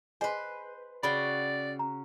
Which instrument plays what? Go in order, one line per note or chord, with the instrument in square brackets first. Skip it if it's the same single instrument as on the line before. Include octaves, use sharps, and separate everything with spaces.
[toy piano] G#4 D#5 G#5 [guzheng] B4 C5
[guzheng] C#3 F#4 G5 [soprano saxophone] D5 [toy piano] B5
[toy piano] A#5